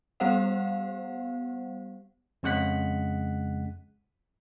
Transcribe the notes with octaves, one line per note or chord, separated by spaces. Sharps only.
G3 B3 G4 C5 F5 F#5
F2 C#3 G#3 F#5 F#6 B6